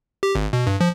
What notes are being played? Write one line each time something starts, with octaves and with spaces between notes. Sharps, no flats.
G4
G#1
B2
G2
F3